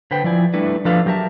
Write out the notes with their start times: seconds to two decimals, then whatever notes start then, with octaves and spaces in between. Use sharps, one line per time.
0.11 D3 B4 C5 G5
0.24 F3 E4 D5 G#5
0.54 G3 A3 D4 E4 B4
0.85 F3 D4 A4 B4 F5
1.06 F#3 G4 A#4 E5 A5